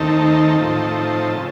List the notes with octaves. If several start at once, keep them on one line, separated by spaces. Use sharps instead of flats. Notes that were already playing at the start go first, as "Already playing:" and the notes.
Already playing: D#2 D#3 A3 C4 D#4 A5
A2 F3 C4 D#4
C#3